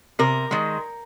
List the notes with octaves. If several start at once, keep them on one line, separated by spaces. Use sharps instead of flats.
C3 A#4
D#3 G#3